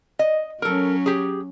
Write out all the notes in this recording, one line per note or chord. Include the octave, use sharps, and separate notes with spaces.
D#5
F#3 C#4 A4 A#4
G4 G#4